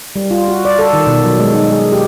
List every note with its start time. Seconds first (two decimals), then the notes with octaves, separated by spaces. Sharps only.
0.16 G3
0.31 F4
0.48 F#4
0.65 D5
0.79 A4
0.93 D#3
1.07 B2
1.25 F#3
1.39 G#3
1.53 D#4
1.71 G#4
1.92 G4